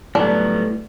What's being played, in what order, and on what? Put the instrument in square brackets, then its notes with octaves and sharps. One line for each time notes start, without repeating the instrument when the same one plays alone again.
[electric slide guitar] A2 [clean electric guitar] F#3 G3 B3 [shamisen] D4